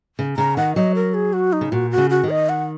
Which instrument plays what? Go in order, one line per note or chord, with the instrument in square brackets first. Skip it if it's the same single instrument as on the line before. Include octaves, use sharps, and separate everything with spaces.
[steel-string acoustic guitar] C#3
[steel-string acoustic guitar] C#3 [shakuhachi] A#5
[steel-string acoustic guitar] D#3 [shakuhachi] F#5
[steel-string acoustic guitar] F#3 [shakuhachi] D#5
[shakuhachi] A#4
G#4
F#4
D#4
[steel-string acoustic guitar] C#3
[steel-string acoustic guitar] A#2 [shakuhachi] F#4
[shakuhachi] F#4
[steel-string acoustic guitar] C#3
[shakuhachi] F#4
[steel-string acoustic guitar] D#3
[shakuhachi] D#5
F#5